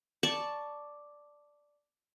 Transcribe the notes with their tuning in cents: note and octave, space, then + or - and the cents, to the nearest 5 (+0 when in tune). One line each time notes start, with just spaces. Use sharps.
D5 +0 A5 +0 C#6 +0